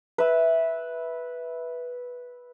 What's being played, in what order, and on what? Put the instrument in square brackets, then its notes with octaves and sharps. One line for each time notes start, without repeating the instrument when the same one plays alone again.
[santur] B4 E5